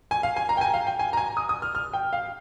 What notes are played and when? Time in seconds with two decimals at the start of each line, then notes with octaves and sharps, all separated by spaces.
0.11 G#5
0.23 F5
0.36 G#5
0.49 A#5
0.57 G5
0.61 G#5
0.74 F5
0.87 G5
0.99 G#5
1.13 A#5
1.17 G#5
1.37 D#6
1.49 D#6
1.62 F6
1.75 F6
1.93 G5
2.13 F5